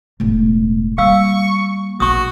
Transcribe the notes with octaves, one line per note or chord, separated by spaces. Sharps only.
E1 A2
G3 A#3 F5 C#6 E6
A#1 F3 F#4 C#6 D#6